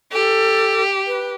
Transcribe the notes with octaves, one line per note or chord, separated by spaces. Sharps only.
G4 A4
B4